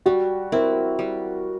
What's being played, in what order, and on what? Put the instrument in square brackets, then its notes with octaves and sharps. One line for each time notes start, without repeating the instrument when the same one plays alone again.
[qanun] G3 [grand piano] F#4
[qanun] C4 E4 [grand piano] A#4
[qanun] G3